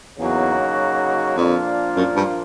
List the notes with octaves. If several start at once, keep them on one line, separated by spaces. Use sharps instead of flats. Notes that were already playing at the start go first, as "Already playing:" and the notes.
E2 C#3 F#3 A#3 D#4 F#4
F2 A#2 F3 A#3 D4 F4
F#2
G2